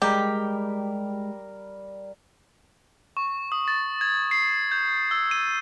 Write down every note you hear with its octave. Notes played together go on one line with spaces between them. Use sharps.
G3 G#3 G4 A#4
C#6
D#6
A6
G#6
C7
G6
E6
D#7